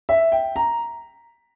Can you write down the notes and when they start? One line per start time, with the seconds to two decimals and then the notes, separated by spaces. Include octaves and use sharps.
0.09 E5
0.32 G5
0.56 A#5